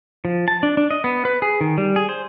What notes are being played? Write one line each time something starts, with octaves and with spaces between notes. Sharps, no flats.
F3
A5
D4
D4
D#5
B3
B4
G#4
D#3
G3
G#4
C5